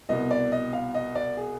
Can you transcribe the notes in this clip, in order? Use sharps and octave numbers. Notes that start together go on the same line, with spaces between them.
C2 B2 D#5
D5
D#5
F5
D#5
D5
G#4